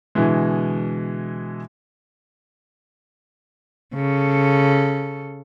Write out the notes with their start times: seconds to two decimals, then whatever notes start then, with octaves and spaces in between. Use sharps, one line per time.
0.15 B2 D3 E3 G#3
3.94 C#3 A4